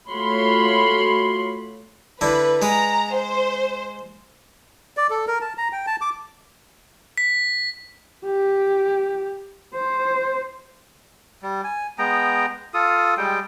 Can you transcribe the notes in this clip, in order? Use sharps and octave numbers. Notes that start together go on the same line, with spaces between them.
A3 F4 F#4 C#5 B5 C6
D3 E4 B4
G#3 B4 A#5
C5
D5
A4
A#4
A5
A#5
G5
A5
D6
B6
G4
C5
G3
G#5
G#3 B3 G5 A#5
F4 A4 D#6
G3 G#3 G5